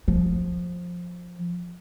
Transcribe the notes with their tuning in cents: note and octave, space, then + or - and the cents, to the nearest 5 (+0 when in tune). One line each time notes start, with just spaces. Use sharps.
F3 +15